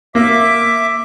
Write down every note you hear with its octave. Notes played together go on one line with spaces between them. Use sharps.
A#3 E5 D6